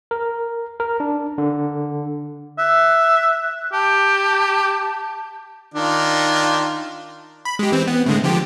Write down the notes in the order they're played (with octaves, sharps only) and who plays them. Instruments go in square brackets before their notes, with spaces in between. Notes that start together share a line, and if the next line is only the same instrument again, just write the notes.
[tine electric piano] A#4
A#4
D4
D3
[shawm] E5 [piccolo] F#6
[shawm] G4 [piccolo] A5
[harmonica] D#3 D4 F4
[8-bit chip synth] B5
G#3 G4
E3 C4
B3
A2 D3 G#3
D3 F3 G4